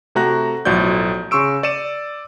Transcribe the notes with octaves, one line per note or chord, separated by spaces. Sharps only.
C3 A3 F#4 A#5 F#6 A#6
B1 A2 F3 F#4 D5 G6
C#3 C6 C#6 E6 D7
D5 C#7 D#7 E7